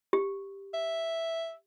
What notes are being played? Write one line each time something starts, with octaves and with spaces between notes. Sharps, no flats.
G4
E5